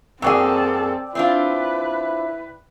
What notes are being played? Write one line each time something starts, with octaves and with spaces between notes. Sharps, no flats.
F#2 A#3 C4 G#4 A4 D5 G5 E6
C4 D4 E4 F4 B4